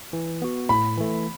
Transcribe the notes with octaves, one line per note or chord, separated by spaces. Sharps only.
E3
B3 F#4
A2 B5
E3 A3